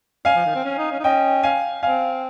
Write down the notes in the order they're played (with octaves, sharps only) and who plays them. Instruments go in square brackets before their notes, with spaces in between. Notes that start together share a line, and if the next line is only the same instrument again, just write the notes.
[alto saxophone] C#4 [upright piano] F5 G#5
[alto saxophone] F3
D#3
C4
C#4
D#4
C#4
D#4
[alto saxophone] C#4 [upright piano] D#5 G5
[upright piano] F5 G#5
[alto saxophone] C4 [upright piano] F5 G#5